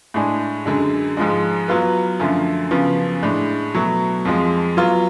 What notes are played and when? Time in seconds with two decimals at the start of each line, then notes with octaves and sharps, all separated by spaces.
0.14 A2 G#3 D4 G#4
0.66 F#2 D3 G#3
1.17 G#2 F3 G#3
1.68 F#3 B3 F4 B4
2.20 F#2 D3 F3 A3
2.71 F#2 C#3 F3 B3
3.22 A2 G#3 D4
3.75 B2 F#3 A3
4.25 F2 F3 G#3
4.77 F#3 B3 F4